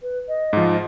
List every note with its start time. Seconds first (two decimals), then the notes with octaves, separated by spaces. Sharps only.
0.02 B4
0.28 D#5
0.53 G#2 F3